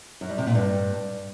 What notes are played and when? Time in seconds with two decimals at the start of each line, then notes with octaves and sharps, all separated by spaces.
0.21 F#2
0.30 G3
0.38 C3
0.47 A#2
0.55 G2